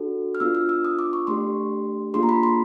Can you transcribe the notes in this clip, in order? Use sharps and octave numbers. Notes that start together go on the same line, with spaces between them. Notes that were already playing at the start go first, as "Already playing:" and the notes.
Already playing: D4 F#4 A4
F6
B3 D4 F4 E6
F6
E6
D#6
D6
C#6
A3 D4 G4 C6
A#3 D4 F4 G#4 C6
A#5
B5
C6